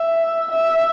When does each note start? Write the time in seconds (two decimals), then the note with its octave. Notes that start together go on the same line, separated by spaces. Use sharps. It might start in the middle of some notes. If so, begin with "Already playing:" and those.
Already playing: E5
0.52 E5